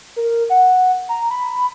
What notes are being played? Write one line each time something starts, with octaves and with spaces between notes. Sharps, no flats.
A#4
F#5
A#5
B5